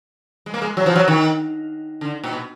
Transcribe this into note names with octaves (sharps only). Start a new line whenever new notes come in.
G#3
A#3
G#3
F#3
F3
F#3
D#3
D3
A#2
B2